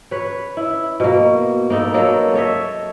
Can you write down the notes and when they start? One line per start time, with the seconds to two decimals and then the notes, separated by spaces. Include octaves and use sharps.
0.11 B4 C#5
0.57 E4
1.00 B2 A#3
1.70 A#3 B3 D#4 A4
1.94 F#3 A#3 A4 C#5
2.34 A4 C#5 D#5 E5